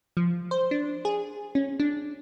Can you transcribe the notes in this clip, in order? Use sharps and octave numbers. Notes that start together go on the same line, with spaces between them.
F3
C5
D4
G#4
C#4
D4